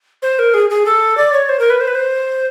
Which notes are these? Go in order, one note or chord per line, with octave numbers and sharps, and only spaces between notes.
C5
A#4
G#4
G#4
A4
D5
C#5
C5
A#4
B4
C5
B4
C5